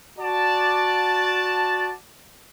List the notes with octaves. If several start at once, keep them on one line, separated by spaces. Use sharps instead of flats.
F#4 D5 A5